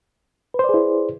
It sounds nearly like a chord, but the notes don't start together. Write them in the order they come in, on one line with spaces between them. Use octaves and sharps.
B4 C5 D5 G#4 E4